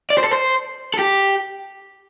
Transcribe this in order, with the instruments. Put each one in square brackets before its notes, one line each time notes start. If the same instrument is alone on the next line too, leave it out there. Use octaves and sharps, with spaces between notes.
[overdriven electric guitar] D5
C5
A4
C5
A4
G4